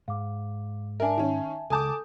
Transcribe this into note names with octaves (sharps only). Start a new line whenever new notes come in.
G#2 F5 D6
D4 A#4 E5 G#5 A5
D#3 C#4
C#2 A4 G#5 A5 D6 D#6 G6